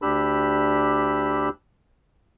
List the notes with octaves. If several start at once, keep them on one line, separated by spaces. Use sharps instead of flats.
D2 D4 G4 B5 E6